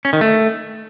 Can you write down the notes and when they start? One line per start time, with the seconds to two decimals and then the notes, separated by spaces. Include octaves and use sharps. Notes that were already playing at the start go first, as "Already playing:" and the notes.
0.05 C#4
0.13 D#3
0.21 A3